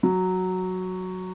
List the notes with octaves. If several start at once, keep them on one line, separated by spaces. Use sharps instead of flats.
F#3